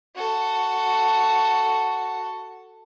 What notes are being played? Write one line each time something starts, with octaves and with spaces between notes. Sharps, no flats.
F#4 A4